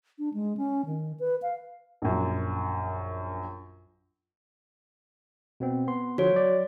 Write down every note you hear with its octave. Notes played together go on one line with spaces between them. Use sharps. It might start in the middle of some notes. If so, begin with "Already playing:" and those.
D4
G#3
C#4
D#3
B4
F5
A#1 F#2
B2 B3 C4
B3 C6
D3 F3 F#4 C#5
F#3 D5